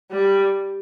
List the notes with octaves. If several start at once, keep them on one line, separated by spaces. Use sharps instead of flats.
G3